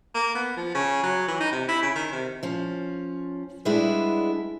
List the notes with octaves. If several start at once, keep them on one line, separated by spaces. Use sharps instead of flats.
A#3
B3
F3
C#3
F#3
E3
D#4
C3
E4
C#3
D#3
C3
F3 C#4
G3 G#3 B3 D4 E4 G#4